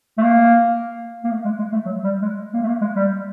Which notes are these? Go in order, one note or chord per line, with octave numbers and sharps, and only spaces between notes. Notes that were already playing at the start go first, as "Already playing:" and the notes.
A3
A#3
A#3
A3
G#3
G#3
A3
F#3
G3
G#3
A#3
A3
A#3
G#3
G3